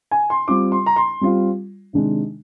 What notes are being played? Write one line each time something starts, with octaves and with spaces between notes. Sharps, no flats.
G#5
C6
G3 C4 F4 D6
C6
A#5
C6
G3 C4 F4
C3 D#3 G#3 D4